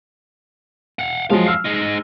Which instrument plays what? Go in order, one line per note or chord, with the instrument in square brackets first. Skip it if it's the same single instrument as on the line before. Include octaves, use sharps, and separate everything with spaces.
[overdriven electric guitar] F5 F#5
[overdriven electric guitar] F#2 F5 [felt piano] F3 F#3 G#3
[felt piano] E6 F6 C7
[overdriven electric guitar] G#3 D#4